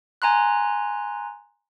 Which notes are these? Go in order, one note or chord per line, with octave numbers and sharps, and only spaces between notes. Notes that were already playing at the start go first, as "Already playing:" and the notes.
G#5 A#5 C6 F#6